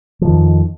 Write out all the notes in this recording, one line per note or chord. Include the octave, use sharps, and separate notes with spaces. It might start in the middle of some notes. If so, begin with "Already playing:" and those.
F2 D#3 F3